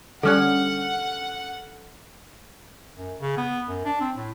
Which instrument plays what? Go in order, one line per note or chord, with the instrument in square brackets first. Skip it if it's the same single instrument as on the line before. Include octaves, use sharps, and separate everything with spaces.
[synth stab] D3 G3 C#4 [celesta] A4 F6 F#6 [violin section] F#5
[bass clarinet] F#2
C#3
B3
F#2
D4
C4
A2